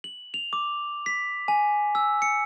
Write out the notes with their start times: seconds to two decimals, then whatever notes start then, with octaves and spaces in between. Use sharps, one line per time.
0.04 F#7
0.34 F7
0.53 D6
1.06 B6
1.48 G#5
1.95 E6
2.22 C#7